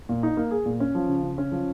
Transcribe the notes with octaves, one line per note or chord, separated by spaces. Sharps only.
A#2
D#4
A#3
G#4
A#2
C#4
F3
C#3
C#3
C#4
F3